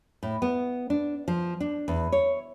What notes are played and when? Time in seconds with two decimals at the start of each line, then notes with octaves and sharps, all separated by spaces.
0.23 A2
0.42 B3
0.90 D4
1.28 F3
1.60 D4
1.88 E2
2.12 C#5